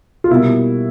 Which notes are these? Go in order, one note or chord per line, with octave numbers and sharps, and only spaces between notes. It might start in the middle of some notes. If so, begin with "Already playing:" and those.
F4
B2 G3 A#3 E4